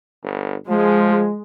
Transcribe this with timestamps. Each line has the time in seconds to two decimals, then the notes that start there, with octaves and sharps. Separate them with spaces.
0.23 G1
0.68 F3 G#3